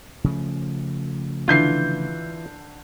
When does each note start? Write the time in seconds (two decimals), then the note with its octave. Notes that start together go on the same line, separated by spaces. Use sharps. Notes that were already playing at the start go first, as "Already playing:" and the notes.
0.24 C#3 F3 A3
1.48 D3 E3 F4 G6 C7